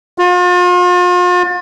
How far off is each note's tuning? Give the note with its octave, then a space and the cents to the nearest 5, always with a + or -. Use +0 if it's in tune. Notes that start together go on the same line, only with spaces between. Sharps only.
F4 +40